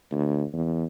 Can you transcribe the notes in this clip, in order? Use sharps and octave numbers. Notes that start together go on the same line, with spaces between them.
D2
E2